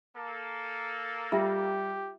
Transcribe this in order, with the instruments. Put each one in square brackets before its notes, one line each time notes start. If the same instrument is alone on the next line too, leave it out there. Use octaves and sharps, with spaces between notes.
[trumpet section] A#3 A4
[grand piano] G3 [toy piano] F4 E5 [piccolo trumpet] G4